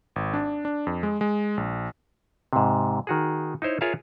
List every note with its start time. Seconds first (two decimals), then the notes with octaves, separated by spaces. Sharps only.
0.16 G#1
0.34 D4
0.65 D4
0.87 F2
1.03 G#3
1.21 G#3
1.57 A#1
2.53 G#2 C3
3.07 D#3 F#4 G#4
3.62 D#4 E4 C5 C#5
3.81 F4 G#4 A#4 C#5 E5 F5